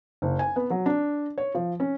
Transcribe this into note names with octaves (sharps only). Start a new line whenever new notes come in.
F#1
G#5
B3
F#3
D4
C#5
F3
C#4